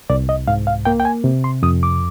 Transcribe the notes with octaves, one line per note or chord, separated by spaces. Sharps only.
C2 D5
D#5
G#2 F5
F5
A#3 G5
G5
G#5
C3
C6
F2 D#6
D6